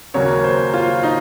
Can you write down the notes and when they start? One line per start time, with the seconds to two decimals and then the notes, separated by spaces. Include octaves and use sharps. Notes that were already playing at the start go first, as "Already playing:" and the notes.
0.14 D#2 C#3 F#3 A#3 C#5
0.44 C5
0.74 F4
1.03 D#4